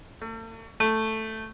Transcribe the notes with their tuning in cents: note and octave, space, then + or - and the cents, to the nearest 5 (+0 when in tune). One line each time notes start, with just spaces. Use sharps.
A3 +45
A3 +5